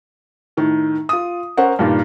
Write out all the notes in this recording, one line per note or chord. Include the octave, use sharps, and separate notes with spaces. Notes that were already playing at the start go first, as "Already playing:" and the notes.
A2 D#3
F4 D#6
C#4 A#4 C5 F#5
G2 A#2 D#3